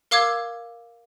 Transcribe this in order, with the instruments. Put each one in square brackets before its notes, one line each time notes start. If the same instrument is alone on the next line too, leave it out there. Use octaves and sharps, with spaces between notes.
[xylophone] A#4 F5 D6 E6 G#6